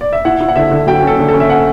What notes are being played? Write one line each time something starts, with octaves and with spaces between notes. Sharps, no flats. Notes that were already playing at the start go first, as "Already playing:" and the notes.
D5
E5
E4 F#5
E4
F#5
D3 E5
D3
F#3 G5
C#4
A4
D3
A4
C#4
E5
C#4 F#5